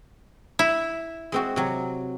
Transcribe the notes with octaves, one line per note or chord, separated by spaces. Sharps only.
E4
G#3 C4 F#4
C3 F#3